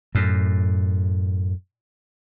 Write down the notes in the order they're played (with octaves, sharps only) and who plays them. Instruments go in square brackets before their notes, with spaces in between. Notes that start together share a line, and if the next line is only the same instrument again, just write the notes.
[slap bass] F#2 A2